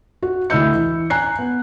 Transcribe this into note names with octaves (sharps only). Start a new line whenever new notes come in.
F#4
D2 E4 D#5 E6 G6 C#7
E3
G#5 A#5 F#6 C7
B3